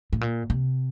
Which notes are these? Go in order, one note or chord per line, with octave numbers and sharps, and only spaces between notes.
A2
A#2
C3